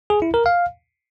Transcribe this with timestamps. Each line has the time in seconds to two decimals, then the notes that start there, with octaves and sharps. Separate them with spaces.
0.10 G#4
0.22 E4
0.34 A#4
0.46 F5